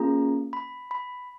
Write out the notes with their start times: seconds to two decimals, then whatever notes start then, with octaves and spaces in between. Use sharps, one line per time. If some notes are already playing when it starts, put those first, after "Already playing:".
Already playing: A#3 C#4 F4 G#4 A#5
0.53 B5
0.91 B5